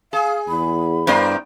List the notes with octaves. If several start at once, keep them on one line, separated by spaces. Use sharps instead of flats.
G#4 F5
E2 B5
G2 B3 E4 A#4 C5 D5